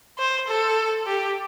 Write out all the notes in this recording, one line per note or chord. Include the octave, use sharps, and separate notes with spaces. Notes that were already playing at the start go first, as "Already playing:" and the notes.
C5
A4
G4